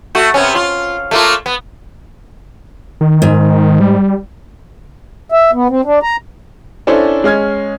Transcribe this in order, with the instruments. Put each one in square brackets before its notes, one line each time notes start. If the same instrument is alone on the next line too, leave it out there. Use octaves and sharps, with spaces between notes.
[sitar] A3 F#4
C3 B3 C#4
F4
A3 A#3 F4
B3
[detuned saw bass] D#3
[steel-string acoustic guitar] G#2
[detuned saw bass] G3
[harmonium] E5
B3
C4
D4
A#5
[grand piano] C#4 D4 E4 A4 C5
G#3 C#4 F6 G#6